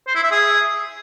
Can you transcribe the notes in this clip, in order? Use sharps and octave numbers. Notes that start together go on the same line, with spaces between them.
C5
E4
E5
G#4